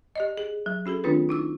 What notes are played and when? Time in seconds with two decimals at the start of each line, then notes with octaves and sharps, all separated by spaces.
0.16 G4 D5 D#5
0.38 G#4
0.66 F#3
0.86 C#4 F#4 G#4 A4
1.04 D#3 A3 C4 D4 F4 B4
1.29 D#4 E4 E6